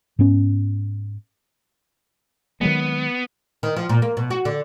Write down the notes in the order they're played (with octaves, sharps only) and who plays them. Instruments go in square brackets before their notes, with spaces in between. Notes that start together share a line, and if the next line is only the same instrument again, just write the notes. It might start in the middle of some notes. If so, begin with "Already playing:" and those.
[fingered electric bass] G#2 B3 C#4
[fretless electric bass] D#3 F#3 G#3 [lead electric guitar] B3
[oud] D#3
F3
A#2
A#3
B2
F#4
D3